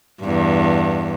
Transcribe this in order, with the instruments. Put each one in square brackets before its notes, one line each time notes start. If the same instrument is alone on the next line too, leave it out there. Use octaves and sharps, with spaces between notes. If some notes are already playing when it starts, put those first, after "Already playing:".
[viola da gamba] E2 G2